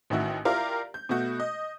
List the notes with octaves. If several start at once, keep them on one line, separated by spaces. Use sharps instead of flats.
A1 D#3 E4 F#4
E4 F4 G4 A#4 D5 F5
G6
B2 A3 F#4 G6
D#5